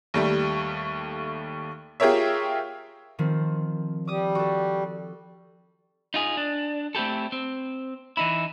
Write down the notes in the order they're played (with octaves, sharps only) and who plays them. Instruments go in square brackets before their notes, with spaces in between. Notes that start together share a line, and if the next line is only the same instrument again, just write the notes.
[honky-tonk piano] D#2 G3 A3
F4 G4 G#4 A#4 C#5 E5
[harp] D#3 F3 C4
[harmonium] G3 [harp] D6 D#6
[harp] F#4 A4
[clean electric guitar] D#4 F4 G#4
D4
A3 C4 E4 G4 A4
C4
E3 D#4 E4